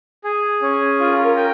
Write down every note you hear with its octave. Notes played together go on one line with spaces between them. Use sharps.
G#4
C#4
F4 A#4
G5